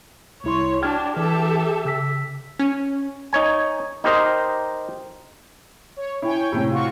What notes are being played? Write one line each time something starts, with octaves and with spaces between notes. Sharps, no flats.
C2 E4 C#5 C6
D4 F#4 G5 F6 G#6
E3 G4 A4 E5
C#3 E6 B6
C#4
D#4 C#5 G#5
D#4 G4 A#4 C5 D#5
C#5
E4 C#5 G5 G#5
A2 C3
F4 F#4 C#6